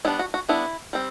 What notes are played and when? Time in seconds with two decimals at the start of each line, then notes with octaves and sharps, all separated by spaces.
0.05 G3 B3 D4 E4
0.19 F#4
0.34 F#4
0.49 G3 B3 D4 E4
0.93 G3 C4